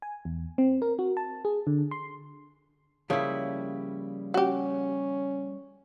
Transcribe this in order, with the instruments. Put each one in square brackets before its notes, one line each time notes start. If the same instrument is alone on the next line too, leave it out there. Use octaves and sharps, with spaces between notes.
[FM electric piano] G#5
E2
C4
A#4
F#4
A5
G#4
D3
C6
[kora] C#3 E4 [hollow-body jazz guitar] F3 G3 A#3
[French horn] C#4 [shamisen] F#4 G4